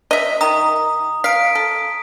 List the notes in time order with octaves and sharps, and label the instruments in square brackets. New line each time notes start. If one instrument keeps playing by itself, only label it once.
[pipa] D#5 E5
[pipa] D#3 [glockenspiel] A#5 D#6
[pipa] F5 [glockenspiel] B6 D7
[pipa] A4